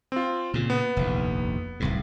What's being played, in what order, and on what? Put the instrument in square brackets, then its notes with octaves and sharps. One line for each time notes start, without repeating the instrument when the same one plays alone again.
[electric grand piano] C4 F4
[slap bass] A#2 C#3
[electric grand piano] B3
[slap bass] F1 A#1 D#2
D1 C2 G#2